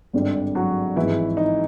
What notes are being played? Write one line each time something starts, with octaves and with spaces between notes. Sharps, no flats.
G#1 G2 D3 G3
F#3 F#4
G#1 G#2 E3 F3 G#3 E4
D#4